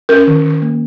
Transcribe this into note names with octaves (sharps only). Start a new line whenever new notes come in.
C#4 A#4
D#3
D#3
A#3